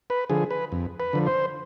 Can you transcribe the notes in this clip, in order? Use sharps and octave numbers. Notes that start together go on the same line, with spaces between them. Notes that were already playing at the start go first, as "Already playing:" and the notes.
B4
D3 F3 G#4
B4
F2
B4
D3 F3
C5